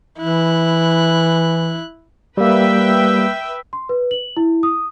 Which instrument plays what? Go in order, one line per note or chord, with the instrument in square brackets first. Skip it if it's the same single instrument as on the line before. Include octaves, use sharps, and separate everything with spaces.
[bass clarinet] E3 [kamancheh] E4 F#6
[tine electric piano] G3 A#3 [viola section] B4 E5 G5
[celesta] C6
B4
F#7
E4
D#6